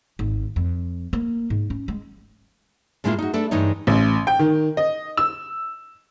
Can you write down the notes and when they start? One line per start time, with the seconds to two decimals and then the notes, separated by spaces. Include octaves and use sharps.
0.19 G#1
0.56 F2
1.13 A#3
1.50 G#2
1.70 C#4
1.88 G#3
3.04 A2 G#3 A#3 B3 E4 F4
3.18 D#4 F#4
3.33 A3 D4 A4 B4
3.51 G2 E3 G#3 D#4 C#5
3.87 A1
4.27 G5
4.39 D#3
4.77 D#5
5.17 E6